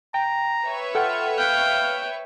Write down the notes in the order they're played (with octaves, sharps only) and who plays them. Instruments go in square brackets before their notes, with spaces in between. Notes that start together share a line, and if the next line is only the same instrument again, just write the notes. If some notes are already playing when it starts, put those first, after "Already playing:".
[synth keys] G5 [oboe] A#5
[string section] B4 C#5 E5
[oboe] F4 [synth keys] A4 F#5 G5
[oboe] F5 [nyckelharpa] G5 [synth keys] F#6 G6